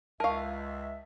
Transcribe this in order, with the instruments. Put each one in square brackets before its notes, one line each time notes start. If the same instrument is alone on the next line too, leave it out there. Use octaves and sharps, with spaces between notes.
[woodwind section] C#2 E5 [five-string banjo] A#4 F5 [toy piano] A5 C#6